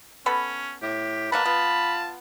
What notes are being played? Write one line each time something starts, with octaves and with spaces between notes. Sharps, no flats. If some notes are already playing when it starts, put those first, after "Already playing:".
B3 C#4 A4 B5
A2 G4
B2 F#3 A#3 B4 A5 B5
B3 F4